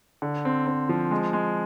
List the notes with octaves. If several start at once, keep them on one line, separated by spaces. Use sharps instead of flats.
D3
C4
C4
F3
G#3
G#3